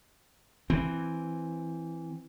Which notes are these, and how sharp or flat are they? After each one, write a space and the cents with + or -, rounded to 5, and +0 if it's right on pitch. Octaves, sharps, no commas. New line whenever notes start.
E3 +5 C4 +0